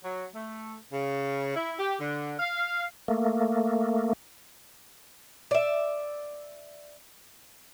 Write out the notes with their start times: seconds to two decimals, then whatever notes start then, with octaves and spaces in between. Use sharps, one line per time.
0.04 F#3
0.34 A3
0.92 C#3
1.56 E4
1.79 G4
1.99 D3
2.39 F5
3.08 A3 A#3
5.51 D5 E5